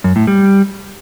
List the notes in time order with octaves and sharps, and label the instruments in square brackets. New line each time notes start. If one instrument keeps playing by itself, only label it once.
[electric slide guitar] F#2
A2
G3